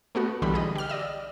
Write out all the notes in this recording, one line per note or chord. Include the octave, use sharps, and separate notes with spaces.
A3 B3 F#4
B1 D3 E3 G3 B5
G#4 D#5
G4 F6
D5 D#5 E6